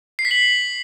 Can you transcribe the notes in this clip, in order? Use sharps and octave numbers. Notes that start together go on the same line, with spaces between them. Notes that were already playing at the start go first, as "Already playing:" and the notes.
C7
B6
F#7